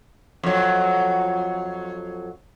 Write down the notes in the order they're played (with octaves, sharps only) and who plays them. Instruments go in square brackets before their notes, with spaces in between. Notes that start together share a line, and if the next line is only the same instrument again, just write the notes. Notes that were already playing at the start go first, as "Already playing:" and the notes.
[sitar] F2 F#3